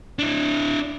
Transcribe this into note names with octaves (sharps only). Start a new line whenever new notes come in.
D4 E4